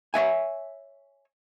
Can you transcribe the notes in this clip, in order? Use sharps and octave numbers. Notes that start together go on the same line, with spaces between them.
C#5 D#5 E5 G#5